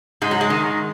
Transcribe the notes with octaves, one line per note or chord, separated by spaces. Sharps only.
G#2 G#3
F#3
G#3
D#3